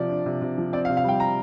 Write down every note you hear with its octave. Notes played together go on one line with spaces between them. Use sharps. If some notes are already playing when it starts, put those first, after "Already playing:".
Already playing: C3 F3 D5
D4
C3
C3
F3
C4 D5
F5
C3
F5
G3 G5
A#5